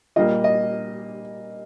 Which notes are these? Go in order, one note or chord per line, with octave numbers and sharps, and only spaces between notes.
A#2 G3 A#3 D#5
D#5